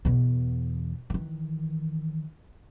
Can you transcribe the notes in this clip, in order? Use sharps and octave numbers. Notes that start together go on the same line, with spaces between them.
E2 B2
D#3 E3